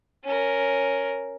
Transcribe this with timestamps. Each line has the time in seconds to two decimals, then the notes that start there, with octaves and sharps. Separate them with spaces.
0.24 C#4 A#4